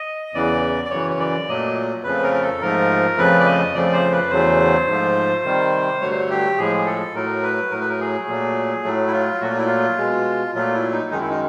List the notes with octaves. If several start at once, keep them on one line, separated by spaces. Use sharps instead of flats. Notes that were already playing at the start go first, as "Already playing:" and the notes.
Already playing: D#5
E2 C#3 E3 D5
D5
F#2 C#3 E3 C#5
C#5
D5
A#2 F#3 A3 D#5
F2 C#3 F3 A3 B4
A#4
A#4
A4
G#2 F3 A3 A#4
F2 C#3 F3 A3 B4
D5
D#5
F2 C#3 F3 A3 D5
C5
B4
E2 C#3 F#3 A3 C5
G#2 F3 A3
C3 D#3 G3
G2 D3 F#3 A3 C#5
C5
C#5
G4
A2 F3 G#3 G#4
A4
A2 F#3 A3 A#4
B4
A2 F#3 A3 A#4
B4
A#4
G#4
A#2 F#3 A3
A2 F#3 A3
E4
F4
A#2 F#3 A3 F#4
F4
E4
F4
B2 G#3
A#2 F#3 A3 F4
E4
D#4
F#2 D#3 G#3 D#4
E4
D#4